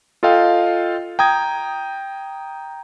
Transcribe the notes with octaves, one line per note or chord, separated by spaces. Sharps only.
F4 A4 D#5 F5 G5
G5 A#5 D#6 G#6